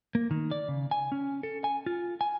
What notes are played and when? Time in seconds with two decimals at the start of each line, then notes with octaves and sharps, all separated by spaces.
0.15 A#3
0.31 D#3
0.51 D5
0.68 C#3
0.91 G#5
1.12 C#4
1.43 A4
1.64 G#5
1.86 F4
2.21 G#5